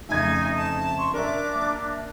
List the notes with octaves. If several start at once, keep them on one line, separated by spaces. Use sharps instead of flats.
F2 C#3 A3 D#4 E5 G#5 G#6
A5
C6 C#6
C#4 D4 A#4 E5 D6
A#3